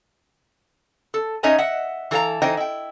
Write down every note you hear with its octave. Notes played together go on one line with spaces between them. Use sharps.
A4
C#4 D#4 C#5 D#5 E5 G#5
D#5 E5 F#5
E3 A4 A#4 F5 A#5
E3 D#4 C5 D#5 G5
E4 G5